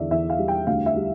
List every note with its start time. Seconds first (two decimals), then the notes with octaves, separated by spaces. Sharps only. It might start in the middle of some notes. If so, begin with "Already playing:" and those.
Already playing: E2 D3 D5 E5
0.10 E2 E5
0.30 F5
0.38 G3
0.48 G5
0.67 D2 F5
0.86 E5
0.96 G3